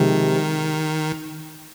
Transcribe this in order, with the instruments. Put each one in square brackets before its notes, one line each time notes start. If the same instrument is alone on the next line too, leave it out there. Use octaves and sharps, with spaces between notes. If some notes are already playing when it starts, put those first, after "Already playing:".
Already playing: [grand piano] C3 F3 G#3 [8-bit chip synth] D#3